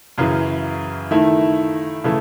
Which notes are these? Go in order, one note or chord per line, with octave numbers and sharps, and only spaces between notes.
F#2 C#3 E3
D#3 A3 E4
C#3 E3 A3